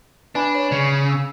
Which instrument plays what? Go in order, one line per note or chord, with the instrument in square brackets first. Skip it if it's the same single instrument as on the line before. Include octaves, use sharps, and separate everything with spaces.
[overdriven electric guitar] D4 [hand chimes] B4 G#5 B5
[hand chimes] C#5
[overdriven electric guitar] C#3
[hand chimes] E6